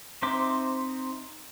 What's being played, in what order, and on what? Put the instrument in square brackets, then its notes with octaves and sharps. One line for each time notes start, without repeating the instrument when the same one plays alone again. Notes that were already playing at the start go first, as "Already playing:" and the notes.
[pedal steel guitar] C4 D#4 C5 E5 D6